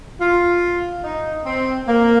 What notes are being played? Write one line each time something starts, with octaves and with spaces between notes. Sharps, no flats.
F4
D#4
C4
A#3